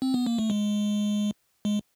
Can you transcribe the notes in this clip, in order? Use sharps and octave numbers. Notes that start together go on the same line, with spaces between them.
C4
B3
A#3
A3
G#3
G#3